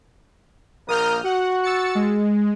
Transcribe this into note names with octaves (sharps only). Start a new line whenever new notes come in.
A#1 A#3 A#4 D#6 F6 G6
F#4 F#5
E6 A6 C#7
G#3